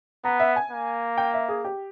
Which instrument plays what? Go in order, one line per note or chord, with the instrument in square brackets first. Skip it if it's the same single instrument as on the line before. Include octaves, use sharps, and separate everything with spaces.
[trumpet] B3 [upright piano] A#5
[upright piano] E5
G#5
[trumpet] A#3
[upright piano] G5
E5
G#4
G4